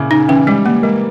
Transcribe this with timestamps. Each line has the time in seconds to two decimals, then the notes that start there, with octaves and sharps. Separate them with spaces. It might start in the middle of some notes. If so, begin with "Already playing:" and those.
Already playing: A#2 C#3 E4
0.11 C#3 D#4
0.28 E3 C#4
0.47 G3 G#3
0.65 G3 A#3
0.82 G#3 A#3